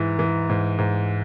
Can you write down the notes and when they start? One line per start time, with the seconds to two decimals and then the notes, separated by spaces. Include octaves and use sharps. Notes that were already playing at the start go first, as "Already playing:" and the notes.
Already playing: G#2 E3
0.19 E3
0.49 G#2
0.78 G#2